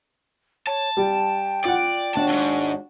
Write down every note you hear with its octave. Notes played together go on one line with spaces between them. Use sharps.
C#5 A5
G3 G5
F4 D5 F#5
D#2 D4 F#4 A5
F2 G#2